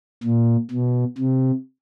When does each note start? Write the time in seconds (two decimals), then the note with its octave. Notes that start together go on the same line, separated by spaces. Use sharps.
0.23 A#2
0.71 B2
1.18 C3